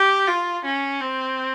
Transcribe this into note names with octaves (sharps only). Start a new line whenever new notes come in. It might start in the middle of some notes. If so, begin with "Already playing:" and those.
Already playing: G4
F4
C#4
C4